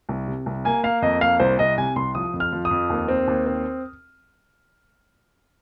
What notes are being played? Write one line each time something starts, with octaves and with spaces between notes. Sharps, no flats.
C2
C3
C2
A#3 G#5
A#3 F5
F2 D#5
A#3 F5
C2 C5
C2 D#5
C3 G#5
C2 C6
F3 D#6
F2
F6
F3
D#6
F2
D#2
C4
D#2
C4